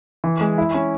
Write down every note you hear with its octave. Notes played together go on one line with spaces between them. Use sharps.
E3
G#3
E4
C#4